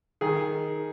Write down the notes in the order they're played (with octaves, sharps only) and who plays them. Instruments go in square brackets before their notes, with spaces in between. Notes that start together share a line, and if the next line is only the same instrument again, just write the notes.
[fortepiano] D#3 G#4